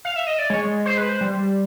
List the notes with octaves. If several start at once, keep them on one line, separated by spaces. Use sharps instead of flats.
F5
E5
D#5
D5
G#3 C#5
C5
B4
C5
G3